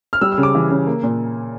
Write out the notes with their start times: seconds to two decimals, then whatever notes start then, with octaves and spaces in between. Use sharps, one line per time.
0.13 F6
0.21 G3 E6
0.32 E6
0.38 C#3
0.43 D6
0.55 E3
0.70 C#3
0.87 A#3
1.03 A#2